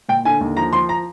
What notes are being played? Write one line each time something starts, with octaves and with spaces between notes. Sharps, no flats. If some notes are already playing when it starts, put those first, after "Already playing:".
A#2 G5
D3 G#5
D#2
F3 A#5
F3 C6
A#5